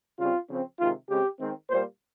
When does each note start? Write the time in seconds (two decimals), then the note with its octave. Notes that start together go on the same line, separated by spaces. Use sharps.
0.19 C#3 G3 C4 F4
0.49 C#3 F3 C4
0.80 C3 D#3 G#3 F4
1.10 C#3 G#3 C4 G4
1.40 D#3 G#3 C4
1.70 A#2 G3 A#3 C5